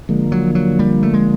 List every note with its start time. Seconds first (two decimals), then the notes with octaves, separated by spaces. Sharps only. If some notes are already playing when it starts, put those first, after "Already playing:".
0.09 D3 F3 G#3 A#3
0.32 F#3
0.55 F#3
0.79 G3
1.03 A3
1.14 G#3